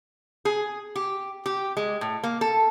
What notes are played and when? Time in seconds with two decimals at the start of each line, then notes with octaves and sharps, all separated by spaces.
0.45 G#4
0.96 G4
1.46 G4
1.77 G#3
2.01 A2
2.23 A#3
2.41 A4